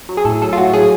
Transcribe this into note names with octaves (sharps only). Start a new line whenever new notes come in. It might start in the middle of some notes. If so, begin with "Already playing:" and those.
F#3
G#4
A2 A4
F#3 A4
F4
A2 F#4
F#3 G#4